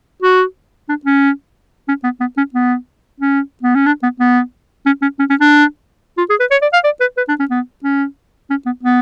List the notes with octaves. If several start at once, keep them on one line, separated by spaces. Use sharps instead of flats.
F#4
D4
C#4
C#4
B3
B3
C#4
B3
C#4
B3
C#4
D4
B3
B3
C#4
C#4
C#4
C#4
D4
F4
G#4
B4
C#5
D5
F5
D5
B4
B4
D4
C#4
B3
C#4
C#4
B3
B3